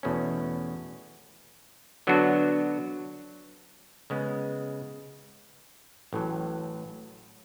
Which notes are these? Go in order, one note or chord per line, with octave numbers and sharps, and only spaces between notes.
E2 B2 A3 C#4
D3 F#3 B3 D4 F#4
C#3 G#3 B3
A1 A2 F#3